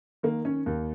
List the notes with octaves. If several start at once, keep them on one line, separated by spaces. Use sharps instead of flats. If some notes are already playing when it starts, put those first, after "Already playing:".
D#3 A#3
C#4
D#2